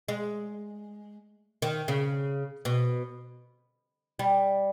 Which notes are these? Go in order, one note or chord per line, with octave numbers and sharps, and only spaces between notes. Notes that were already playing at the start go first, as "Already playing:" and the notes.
G#3
D#3
C#3
B2
G3